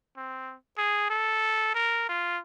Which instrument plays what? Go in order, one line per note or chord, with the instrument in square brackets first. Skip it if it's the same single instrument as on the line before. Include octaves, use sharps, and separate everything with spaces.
[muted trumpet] C4
G#4
A4
A#4
F4